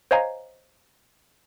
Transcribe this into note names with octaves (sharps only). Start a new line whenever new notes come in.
C5 C#5 D#5 F5 G#5 A#5